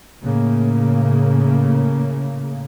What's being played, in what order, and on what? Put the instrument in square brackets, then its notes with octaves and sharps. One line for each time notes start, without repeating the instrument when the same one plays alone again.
[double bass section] A2 C#3 A#3